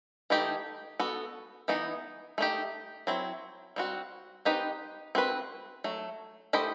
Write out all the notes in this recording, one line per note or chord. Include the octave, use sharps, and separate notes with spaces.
E3 A3 D#4 G4
B3 F#4 A4
E3 B3 D#4
A3 D#4 G4
F#3 C4 E4
G3 C4 F#4
C4 D#4 G4 B4
C4 F#4 B4
F#3 A3
A3 E4 G4 C5 D#5